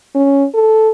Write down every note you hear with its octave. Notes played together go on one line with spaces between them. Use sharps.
C#4
A4